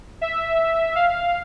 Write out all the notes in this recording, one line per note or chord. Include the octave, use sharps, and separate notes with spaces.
E5
F5